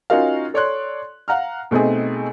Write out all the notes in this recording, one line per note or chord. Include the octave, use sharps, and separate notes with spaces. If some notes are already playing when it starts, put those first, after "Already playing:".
C#4 D#4 F4 F#4 A#4 F5
A4 C#5 D5 C6 F#6
F5 F#5 A#5 F6
B2 A3 C4 D#4 G#4